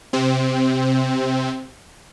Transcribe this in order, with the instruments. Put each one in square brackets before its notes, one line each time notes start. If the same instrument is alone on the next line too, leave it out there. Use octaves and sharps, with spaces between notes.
[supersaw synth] C3 C4